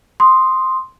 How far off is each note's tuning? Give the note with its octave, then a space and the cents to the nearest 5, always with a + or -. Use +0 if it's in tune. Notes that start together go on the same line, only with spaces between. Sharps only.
C6 +0 D#6 -5